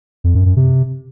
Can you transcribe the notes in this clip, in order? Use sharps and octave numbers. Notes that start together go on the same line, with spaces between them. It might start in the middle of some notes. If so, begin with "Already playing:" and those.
F2
F#2
F#2
C3